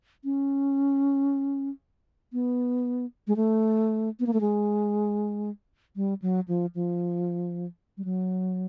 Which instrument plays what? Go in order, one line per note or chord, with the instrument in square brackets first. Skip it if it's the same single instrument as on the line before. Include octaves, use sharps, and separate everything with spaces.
[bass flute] C#4
B3
G#3
A3
B3
A#3
A3
G#3
G3
F#3
F3
F3
G3
F#3